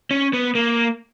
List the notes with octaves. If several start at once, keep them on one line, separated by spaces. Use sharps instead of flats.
C#4
B3
A#3